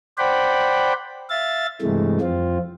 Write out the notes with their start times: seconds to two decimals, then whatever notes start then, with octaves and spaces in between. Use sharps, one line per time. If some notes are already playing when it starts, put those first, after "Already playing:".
0.18 C5 D5 F#5 G5 B5
1.30 E5 F5 A6
1.82 G2 C3 E3 G#3 A3
2.21 F2 C4 F4